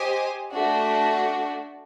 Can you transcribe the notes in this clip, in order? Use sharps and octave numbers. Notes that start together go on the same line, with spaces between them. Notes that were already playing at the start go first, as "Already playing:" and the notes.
Already playing: G4 C5 D#5 G#5
A3 D4 F#4